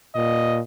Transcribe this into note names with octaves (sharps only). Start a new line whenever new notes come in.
A#2 D#5